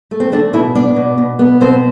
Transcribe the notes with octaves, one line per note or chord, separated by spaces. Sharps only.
A3
C4
D3 A3 D4
B2 E3 E4
B3 D4 D5
B2
B2
B3
B2 C4 C5